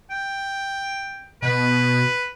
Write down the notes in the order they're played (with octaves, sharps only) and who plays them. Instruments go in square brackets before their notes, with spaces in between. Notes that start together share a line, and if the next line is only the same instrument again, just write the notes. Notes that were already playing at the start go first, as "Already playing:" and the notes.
[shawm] G5
[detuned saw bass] B2 [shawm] B4